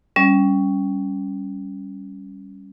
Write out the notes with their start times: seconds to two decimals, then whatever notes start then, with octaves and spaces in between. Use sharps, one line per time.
0.16 G3 C#4